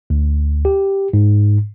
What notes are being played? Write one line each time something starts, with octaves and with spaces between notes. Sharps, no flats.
D2
G4
G#2